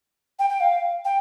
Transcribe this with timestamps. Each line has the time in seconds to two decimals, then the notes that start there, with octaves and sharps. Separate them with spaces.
0.39 G5
0.50 G5
0.61 F5
1.05 G5